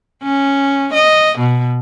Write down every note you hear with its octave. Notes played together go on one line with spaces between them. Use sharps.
C#4
D#5
B2